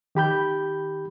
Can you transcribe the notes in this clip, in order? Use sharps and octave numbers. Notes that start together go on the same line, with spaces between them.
D#3 G4 B5 G6